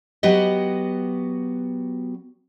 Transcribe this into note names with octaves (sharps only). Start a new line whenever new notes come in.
F#3 B3 F#4 G4 D#5